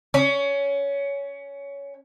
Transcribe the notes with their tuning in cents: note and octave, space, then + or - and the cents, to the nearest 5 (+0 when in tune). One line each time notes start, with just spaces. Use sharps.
C#4 +15